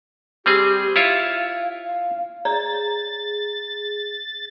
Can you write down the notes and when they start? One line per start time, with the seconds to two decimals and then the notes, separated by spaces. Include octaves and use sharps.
0.46 G3 C4 G4 G#4
0.96 E4 F4 C#5 F5
1.86 F5
2.45 G#4 C#5 D5 A#5 A6